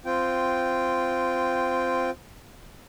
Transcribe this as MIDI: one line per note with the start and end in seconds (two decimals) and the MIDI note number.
0.05 2.10 60
0.05 2.10 65
0.05 2.10 79